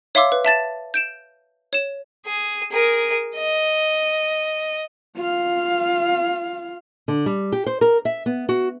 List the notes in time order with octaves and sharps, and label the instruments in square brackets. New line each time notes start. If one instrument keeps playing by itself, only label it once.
[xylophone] C#5 E5 F5 C6 D6 E6
B4
E5 A5 A6 E7
G6 D7 E7
C#5 E7
[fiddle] G#4
G#4 A#4
D#5
[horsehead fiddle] F4 F5
[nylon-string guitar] D3
G3
G4
C5
A#4
E5
B3
F#4